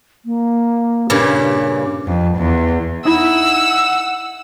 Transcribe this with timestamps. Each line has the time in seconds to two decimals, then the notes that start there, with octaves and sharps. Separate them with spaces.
0.25 A#3
1.10 G2 A#2 C#3 G4
2.06 F2
2.37 E2
3.05 D#4 E4 F#5 B5 E6